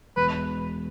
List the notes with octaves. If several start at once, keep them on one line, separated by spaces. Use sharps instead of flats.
E1 B4